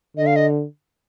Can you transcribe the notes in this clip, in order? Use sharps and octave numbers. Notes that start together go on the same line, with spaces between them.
D3 D#5
F5
D#5